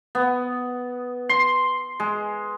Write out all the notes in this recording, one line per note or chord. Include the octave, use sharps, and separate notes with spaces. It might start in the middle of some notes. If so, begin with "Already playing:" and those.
B3
C6
G#3